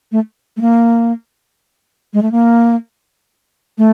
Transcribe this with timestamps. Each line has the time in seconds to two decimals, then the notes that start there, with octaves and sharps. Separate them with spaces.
0.12 A3
0.57 A3
0.61 A#3
2.13 G#3
2.22 A3
2.32 A#3
3.78 A3